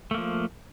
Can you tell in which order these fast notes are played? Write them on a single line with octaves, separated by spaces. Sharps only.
A3 A#3 F3